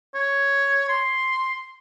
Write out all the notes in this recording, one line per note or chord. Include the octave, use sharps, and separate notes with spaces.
C#5
C6